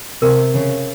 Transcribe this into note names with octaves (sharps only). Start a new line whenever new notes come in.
C3 A#4
C#3